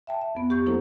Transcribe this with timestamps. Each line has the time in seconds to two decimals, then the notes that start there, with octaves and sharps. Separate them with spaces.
0.07 E5 G5 A5
0.21 E5
0.35 F2 B3
0.50 G4 C#6 G6
0.66 F#3 A#3 D4 E4 A4 C5